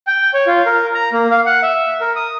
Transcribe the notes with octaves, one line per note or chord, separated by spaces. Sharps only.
G5
C#5
F4
A#4
A#5
A#3
F5
F#5
E5
A#4
D#6